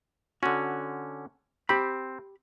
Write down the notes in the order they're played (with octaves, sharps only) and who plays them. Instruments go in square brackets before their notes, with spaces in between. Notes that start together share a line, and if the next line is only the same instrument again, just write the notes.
[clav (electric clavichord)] D3 C#4 [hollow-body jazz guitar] F#4
[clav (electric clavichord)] C4 [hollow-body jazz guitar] G4 B5